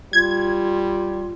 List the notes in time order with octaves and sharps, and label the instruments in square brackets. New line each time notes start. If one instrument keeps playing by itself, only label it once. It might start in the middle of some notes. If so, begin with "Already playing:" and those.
[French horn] G3 [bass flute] F4 [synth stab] G#6